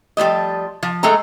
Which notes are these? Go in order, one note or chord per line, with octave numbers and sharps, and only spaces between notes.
F3 G3 A3 D#5
F3
G#3 A3 A4 G#5 A#5